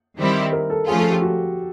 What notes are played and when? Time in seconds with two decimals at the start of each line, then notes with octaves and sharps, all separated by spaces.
0.18 D#3 G3 C4 E4 G4
0.53 A#4
0.70 A4
0.87 F3 A3 C#4 F4 G#4
0.99 A4
1.10 G4
1.22 F#4